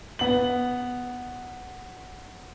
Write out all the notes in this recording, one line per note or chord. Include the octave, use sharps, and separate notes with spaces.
B3 F#7